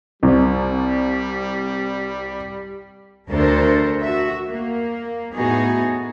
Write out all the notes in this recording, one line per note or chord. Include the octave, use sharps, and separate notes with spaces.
C2 G3
D2 A3 D4 A4 A#4 C5
F#4 E5
A#3
A2 B3 D#4 F#4 G#4